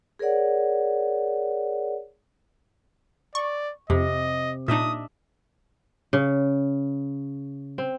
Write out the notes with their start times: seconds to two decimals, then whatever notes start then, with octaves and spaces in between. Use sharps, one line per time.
0.19 G#4 A#4 C#5 D5 F#5
3.35 D5 C#6
3.90 F2 C3 D#5
4.68 A#2 D4 D#4 D#5 E5 D#6
6.13 C#3
7.78 C4